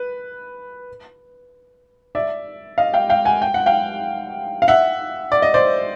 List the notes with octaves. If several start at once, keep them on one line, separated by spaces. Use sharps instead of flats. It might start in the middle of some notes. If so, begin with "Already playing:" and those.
Already playing: B4
D5 E5
D#5 F5
F5 G5
F5 G5
F#5 G#5
G5
F#5
F5 G5
F5
E5 F#5
D5
D#5
C5 D5